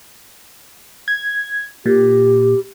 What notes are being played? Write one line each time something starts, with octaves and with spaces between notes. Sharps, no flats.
G#6
A#2 G4